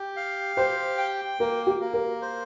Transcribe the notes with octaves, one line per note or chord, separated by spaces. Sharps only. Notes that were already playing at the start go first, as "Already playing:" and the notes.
Already playing: G4
F5
G4 C5
G5
A#3 A#4
G4
A#3
A#4
C5